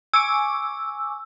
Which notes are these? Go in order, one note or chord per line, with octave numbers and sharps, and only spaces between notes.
G#5 C#6 D6 E6